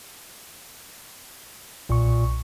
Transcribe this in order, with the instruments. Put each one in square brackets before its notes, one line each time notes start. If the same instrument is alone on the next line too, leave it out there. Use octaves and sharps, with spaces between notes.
[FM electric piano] B1 C#6 [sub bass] A#2